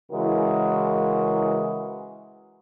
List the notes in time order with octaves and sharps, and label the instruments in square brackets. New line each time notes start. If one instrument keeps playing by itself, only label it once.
[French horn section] C#3 E3 G#3 E4 F#4 A#4